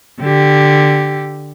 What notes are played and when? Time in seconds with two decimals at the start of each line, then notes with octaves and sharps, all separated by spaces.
0.21 D3 G4